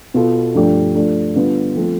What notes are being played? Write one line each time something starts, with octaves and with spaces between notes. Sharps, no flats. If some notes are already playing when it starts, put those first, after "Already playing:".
B2 B3 F4 A4
G2 F3 A3 D4 G4
F3 A3 D4 F4
D3 G3 B3 F4 B4
F3 A3 C4 F4 A4